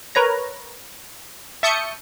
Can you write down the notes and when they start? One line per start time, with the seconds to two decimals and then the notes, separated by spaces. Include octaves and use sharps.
0.15 A#4 B4 C#5 A#5
1.63 E5 A5 C#6 D#6 G6 C#7